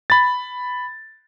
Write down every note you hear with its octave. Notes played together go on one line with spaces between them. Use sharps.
B5 A6